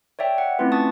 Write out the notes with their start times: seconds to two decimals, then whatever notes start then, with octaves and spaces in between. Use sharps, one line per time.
0.19 C#5 D5 E5 G5
0.38 F#5
0.59 A3 C4 C#4 E4 F4 B4
0.72 A5 C#6 D#6 A6